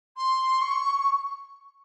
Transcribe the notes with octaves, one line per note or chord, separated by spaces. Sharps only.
C6
C#6